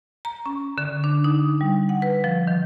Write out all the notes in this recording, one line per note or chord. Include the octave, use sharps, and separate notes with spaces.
A#5
C#4
D3
D4
D#4
G3
F#5
B4
F3
D#3